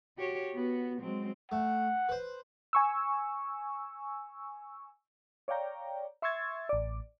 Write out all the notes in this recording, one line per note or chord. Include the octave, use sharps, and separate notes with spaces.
F#4 G4 C#5
B3 F#4
F#3 G#3 C4
A3 F#5
B4 C5
G#5 C#6 E6
C#5 D5 F5 G5 A#5
E5 C6 C#6 E6 G#6 A6
A1 D5